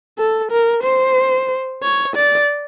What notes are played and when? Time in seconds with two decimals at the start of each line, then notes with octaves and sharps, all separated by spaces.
0.19 A4
0.51 A#4
0.83 C5
1.83 C#5
2.16 D5